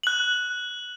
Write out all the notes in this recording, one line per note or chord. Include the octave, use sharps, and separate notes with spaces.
F#6 F#7